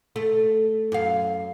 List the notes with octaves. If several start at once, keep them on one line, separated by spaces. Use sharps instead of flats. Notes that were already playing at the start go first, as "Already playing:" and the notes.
A3
F#2 F5